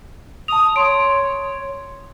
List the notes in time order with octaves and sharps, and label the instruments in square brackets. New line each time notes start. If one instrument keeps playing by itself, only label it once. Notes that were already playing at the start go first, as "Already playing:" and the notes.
[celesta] A5 F7 [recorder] D#6
[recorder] C#5 [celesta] C6 D7